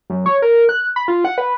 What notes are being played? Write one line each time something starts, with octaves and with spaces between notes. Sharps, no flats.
F#2
C#5
A#4
F#6
B5
F4
F#5
B4